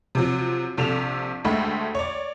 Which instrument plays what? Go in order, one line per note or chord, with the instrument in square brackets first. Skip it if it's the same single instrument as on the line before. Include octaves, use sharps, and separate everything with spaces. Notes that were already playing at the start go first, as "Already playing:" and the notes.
[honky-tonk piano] C3 F3 F#3
A#1 C3 A4 E7 F7
D2 G#3 A3 E5 G5 B5
C#5 D5